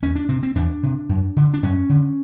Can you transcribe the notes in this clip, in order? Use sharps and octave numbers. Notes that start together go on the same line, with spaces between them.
E2 C#4
D4
C3 C4
C4
E2 D4
C3
F#2
D3
D4
F#2 C#4
D3